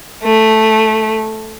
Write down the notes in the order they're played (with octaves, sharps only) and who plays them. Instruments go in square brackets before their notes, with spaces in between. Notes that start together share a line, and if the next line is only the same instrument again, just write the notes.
[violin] A3